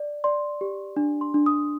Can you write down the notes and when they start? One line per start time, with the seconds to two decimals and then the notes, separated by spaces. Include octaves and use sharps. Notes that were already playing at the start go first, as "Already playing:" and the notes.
Already playing: D5
0.24 D5 C6
0.61 G4
0.96 D4
1.21 C6
1.34 D4
1.46 D#6